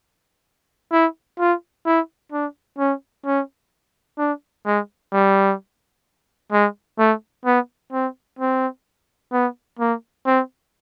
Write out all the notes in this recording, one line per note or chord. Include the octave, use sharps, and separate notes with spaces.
E4
F4
E4
D4
C#4
C#4
D4
G#3
G3
G#3
A3
B3
C4
C4
B3
A#3
C4